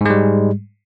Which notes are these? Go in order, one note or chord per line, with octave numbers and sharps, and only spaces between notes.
G#2 G3 G#3